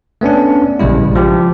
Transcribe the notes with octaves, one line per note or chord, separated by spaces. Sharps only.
A3 B3 C#4 D4
A#1 C#3 G3 G#3 E4
F3 G4